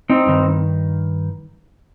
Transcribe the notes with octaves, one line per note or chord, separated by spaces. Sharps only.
C4 D#4
G2 D#3